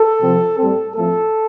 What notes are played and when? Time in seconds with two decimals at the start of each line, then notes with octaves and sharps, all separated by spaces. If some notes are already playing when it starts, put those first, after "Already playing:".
Already playing: A4
0.21 C3 F3 C4
0.58 A2 G3 C4 A4
0.95 A2 F3 A3 C4 A4